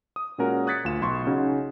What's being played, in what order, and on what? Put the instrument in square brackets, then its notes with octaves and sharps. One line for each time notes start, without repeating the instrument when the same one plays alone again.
[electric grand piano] D#6
A#2 G#3 C#4 F#4 A#4
D#6 F#6 G#6 A6 B6 C#7
D2 F4 E7
B1 C6 C#6
C#3 C#4 D#4 F#4